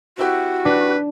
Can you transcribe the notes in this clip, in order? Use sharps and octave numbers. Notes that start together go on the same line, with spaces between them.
C4 E4 F#4 G4
D4 B4